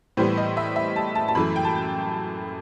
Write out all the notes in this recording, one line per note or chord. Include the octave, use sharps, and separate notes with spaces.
A2 E3 G3 B3 C5
D#5
E5
E5
A5
A5
A5
F#2 E3 A3 B5
G5
A5